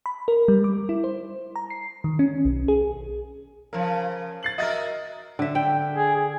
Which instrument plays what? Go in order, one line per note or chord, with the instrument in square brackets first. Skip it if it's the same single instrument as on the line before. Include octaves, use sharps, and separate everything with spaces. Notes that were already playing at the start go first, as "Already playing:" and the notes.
[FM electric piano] B5
A#4
G3
D6
E4
C5
A#5
C7
D#3
C#4
B1
G#4
[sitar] C#3 F3 [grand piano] A#4
[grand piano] A6 C7 F#7
[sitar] F#4 A#4 [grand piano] D#5 E5 A6
[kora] D3 E5
G5
[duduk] G#4
G#4